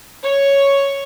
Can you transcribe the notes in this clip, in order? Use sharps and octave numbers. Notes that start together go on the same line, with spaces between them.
C#5